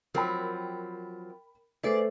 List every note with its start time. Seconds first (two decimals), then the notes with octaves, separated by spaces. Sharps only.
0.14 F3 F#3 C4 A#4 G5 B5
1.83 A3 G#4 B4 C5 D5